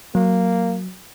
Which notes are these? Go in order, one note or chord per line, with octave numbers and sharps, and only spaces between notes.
F#3 A#3